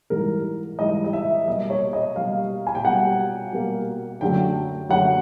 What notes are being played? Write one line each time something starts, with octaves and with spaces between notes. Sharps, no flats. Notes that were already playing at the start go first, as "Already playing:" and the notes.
G#2 E3 G3 A#4
G#2 E3 G3 D#5
D#5
E5
B2 G3 A#3 D#5
C#5
D#5
B2 G3 A#3 F5
G#5
G5
B2 G3 A#3 F#5
B2 G3 A#3
F#2 D3 F#3 A3 G5
F#2 D3 F#3 A3 F#5